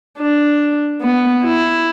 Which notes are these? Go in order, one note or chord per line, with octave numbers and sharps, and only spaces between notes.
D4
B3
E4